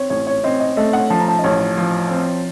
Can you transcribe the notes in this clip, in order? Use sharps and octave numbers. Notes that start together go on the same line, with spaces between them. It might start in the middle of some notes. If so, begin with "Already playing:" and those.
Already playing: C4 C#5
A1 C#5
C#5
C4 D#5
D#5
A3 D#5
F#5
F3 A5
A#5
A5
D#5
A1 C#5
F3
C4